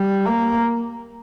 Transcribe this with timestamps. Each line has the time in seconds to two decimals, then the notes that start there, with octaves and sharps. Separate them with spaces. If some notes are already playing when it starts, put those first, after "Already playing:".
Already playing: G3
0.26 A#3